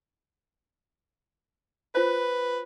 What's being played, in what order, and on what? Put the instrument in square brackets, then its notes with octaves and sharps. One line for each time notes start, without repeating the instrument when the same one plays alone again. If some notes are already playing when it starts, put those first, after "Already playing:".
[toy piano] F4 C5 [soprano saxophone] B4